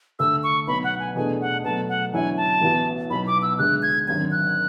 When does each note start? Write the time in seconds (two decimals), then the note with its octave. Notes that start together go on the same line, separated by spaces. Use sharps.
0.19 D2 D3 A3 E6
0.43 C#6
0.67 B1 B2 F#3 B3 B5
0.84 F#5
1.00 G#5
1.16 E2 B2 A3 D4 G#4 G#5
1.41 F#5
1.64 B2 F#3 A3 A5
1.89 F#5
2.13 E2 D3 F#3 C#4 E4 G#5
2.37 A5
2.61 A1 A2 E3 B3 F#4
3.10 B1 B2 F#3 B3 B5
3.27 D6
3.42 E6
3.58 D2 D3 G#3 F#6
3.83 G#6
4.07 G#1 F#2 D3 F#3 G#6
4.32 F#6